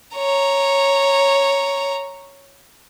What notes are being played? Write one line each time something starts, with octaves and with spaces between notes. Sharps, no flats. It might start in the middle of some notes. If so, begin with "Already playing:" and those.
C#5 A#5